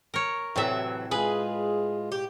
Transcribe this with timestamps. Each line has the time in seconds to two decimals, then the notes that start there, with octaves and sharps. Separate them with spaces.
0.14 A#4 C#5
0.56 A2 C3 E3 F#3 E5
1.11 G#3 F4 G#4 B4
2.12 G4